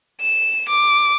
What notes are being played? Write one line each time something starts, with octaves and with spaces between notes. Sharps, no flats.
E7
D6